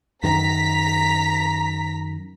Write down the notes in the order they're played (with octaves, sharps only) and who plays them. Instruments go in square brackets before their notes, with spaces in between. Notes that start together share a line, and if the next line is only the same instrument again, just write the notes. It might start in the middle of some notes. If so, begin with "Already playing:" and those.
[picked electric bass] F#2 D#3 [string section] A#5 B6